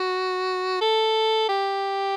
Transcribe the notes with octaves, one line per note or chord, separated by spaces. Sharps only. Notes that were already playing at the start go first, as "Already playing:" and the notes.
Already playing: F#4
A4
G4